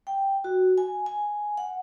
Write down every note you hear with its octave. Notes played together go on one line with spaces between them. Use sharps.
G5
F#4
G#5
G#5
F#5